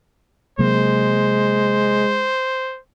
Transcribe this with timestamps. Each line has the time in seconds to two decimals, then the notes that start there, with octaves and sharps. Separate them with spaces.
0.59 C3 F#3 G#3 A#3 C5